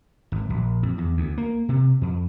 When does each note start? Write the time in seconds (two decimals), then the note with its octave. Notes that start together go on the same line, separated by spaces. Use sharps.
0.32 G#1
0.50 A#1
0.83 F2
0.98 E2
1.17 D2
1.38 A#3
1.69 C3
2.02 F2